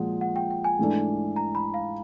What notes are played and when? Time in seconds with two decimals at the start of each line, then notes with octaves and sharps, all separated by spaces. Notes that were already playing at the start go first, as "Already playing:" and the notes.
Already playing: A#2 F3 G#3 F#5
0.21 F#5
0.36 G5
0.51 G5
0.64 G#5
0.78 G#2 E3 A3 D4
1.36 A#5
1.55 B5
1.74 F5